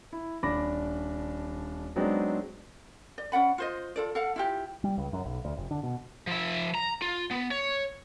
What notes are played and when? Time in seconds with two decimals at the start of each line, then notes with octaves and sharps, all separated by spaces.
0.13 E4
0.43 D#1 D4 B5 D6 A#6
1.96 F#3 G#3 B3 C4 D4 D#4
3.18 D5
3.32 C#4 D5 F#5 B5
3.58 F4 C5 D#5
3.96 F4 A4 D5
4.15 A4 F5 F#5
4.36 E4 F4 G4
4.84 G3
4.98 C#2
5.13 F#2
5.25 B1
5.45 D2
5.57 F1
5.71 D3
5.83 B2
6.27 F3 E5
6.75 A#5
7.02 F4
7.31 B3
7.51 C#5